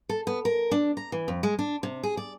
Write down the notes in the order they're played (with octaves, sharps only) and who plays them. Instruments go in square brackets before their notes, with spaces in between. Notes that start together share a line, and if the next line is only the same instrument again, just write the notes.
[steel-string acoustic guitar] A4
B3
A#4
D4
A#5
E3
F2
G#3
D4
C3
G#4
D5